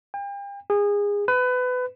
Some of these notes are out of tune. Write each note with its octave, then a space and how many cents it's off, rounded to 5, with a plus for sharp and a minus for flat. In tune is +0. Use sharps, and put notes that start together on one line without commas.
G5 +40
G#4 -25
B4 +25